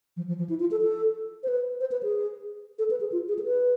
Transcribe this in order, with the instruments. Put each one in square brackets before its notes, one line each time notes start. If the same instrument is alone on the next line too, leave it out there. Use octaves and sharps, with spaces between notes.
[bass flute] F3
F3
F3
E4
F4
A4
A4
C5
B4
C5
B4
G#4
A4
B4
G#4
F4
G#4
A4
B4